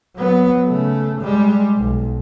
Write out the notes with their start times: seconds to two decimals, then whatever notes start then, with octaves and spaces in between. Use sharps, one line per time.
0.16 F#3 B3
0.66 C#3 A3
1.21 G3 G#3
1.77 B1